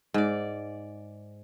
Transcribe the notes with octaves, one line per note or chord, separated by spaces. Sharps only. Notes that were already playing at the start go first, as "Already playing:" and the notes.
G#2 D5